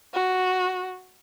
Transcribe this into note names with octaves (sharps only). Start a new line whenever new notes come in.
F#4